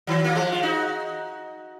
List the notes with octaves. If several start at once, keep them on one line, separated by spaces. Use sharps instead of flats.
D#3 F#3
A#3
F3 G#3
F4
D#4 F#4